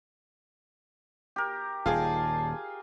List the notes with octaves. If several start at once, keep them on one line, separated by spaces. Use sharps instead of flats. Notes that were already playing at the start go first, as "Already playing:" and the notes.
G4 A#4
D#1 D#3 F4 G#4 A5